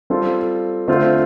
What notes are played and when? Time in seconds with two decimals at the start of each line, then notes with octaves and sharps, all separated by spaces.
0.10 G3 C4 F4 A4
0.88 D3 A3 C4 F4 C5